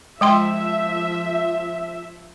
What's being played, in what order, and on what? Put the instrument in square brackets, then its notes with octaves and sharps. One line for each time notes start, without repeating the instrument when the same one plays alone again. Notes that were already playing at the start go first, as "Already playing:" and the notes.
[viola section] F3 E5 [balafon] G#3 G5 C6